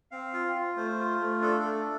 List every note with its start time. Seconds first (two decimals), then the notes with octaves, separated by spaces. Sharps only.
0.11 C4 F5
0.33 F4
0.55 F4
0.76 A3 C5
0.99 F4
1.20 A3
1.42 D4 A4
1.63 A3